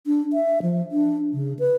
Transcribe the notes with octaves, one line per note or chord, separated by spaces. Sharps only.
D4
E5
F3
D4
C#3
B4